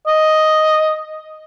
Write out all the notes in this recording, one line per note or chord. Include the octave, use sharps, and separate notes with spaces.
D#5